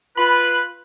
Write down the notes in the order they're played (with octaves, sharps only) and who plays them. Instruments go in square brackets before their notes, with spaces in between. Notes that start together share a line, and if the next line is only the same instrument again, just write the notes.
[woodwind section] F4 B4 [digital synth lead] B5